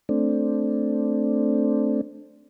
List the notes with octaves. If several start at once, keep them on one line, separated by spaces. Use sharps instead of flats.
A3 C4 D4